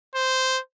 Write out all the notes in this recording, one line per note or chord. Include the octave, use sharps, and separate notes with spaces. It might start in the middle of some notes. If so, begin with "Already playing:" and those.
C5